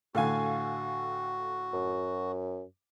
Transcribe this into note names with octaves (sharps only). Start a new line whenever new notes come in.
A2 D3 F#4 A4 F5 G#5
F#2